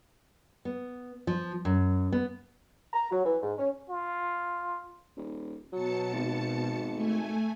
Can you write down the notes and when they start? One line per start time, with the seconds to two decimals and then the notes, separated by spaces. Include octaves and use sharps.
0.65 B3
1.27 F3
1.65 F#2
2.12 B3
2.93 A#5
3.10 F#3
3.25 E3
3.42 G#2
3.57 C#4
3.90 F4
5.17 D#1
5.73 B2 F#3 A5 C#7
6.14 G#1
6.93 A3 G#5